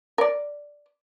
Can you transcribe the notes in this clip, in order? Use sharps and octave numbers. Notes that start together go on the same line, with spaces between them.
A#4 D5